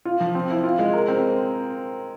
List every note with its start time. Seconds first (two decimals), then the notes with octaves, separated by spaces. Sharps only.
0.05 F4
0.20 F3
0.35 C4
0.50 E4
0.64 F4
0.79 G#3
0.93 A#4
1.08 C4